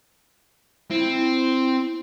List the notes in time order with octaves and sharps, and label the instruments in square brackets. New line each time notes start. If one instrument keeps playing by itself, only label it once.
[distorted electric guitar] C4 [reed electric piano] E4